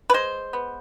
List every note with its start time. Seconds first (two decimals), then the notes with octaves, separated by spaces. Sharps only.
0.10 B4
0.14 G#3 C5
0.53 B3